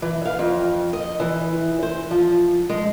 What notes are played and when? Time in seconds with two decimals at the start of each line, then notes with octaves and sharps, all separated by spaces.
0.02 E3
0.25 F5
0.39 F2
0.93 D#5
1.20 E3
1.83 C5
2.11 F3
2.69 G#3